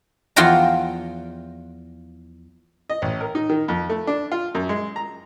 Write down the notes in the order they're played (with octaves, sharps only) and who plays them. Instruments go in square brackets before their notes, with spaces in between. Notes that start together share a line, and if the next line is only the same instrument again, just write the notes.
[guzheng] E2 F3 F4 F#5 G5 A#5
[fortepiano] D#5
A1
A#4
D#4
D#3
F2
A3
D4
F4
F#2
G#3
A#5